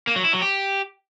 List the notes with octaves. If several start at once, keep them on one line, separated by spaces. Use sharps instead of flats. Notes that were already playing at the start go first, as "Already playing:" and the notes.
A#3
F#3
E4
F#3
G4